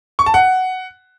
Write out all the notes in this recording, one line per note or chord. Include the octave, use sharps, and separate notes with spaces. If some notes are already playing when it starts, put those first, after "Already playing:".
C#6
A5
F#5